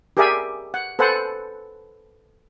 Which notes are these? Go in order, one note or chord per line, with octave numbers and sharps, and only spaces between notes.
G4 G#4 A#4 D5 E5 G#5
F#5
A4 B4 C5 F#5 G#5